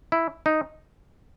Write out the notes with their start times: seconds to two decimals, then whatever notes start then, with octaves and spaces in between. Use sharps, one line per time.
0.12 E4
0.46 D#4